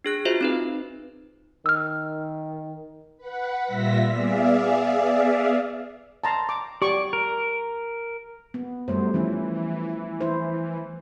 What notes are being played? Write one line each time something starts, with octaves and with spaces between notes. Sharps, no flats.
D4 G#4 F#6
F4 F#4 G#4 C5 E5
C4 D#4 B4
D#3 E6 F6
B4 F#5
A#2 G3 F4 E5 A#6 B6
B3 G#4 D5 E5 F5
A5 A#5 C6
D6
G4 D5 C#6
A#4
B3
F#2 G3 A3 C5
E3 F3 C#4
E4 C5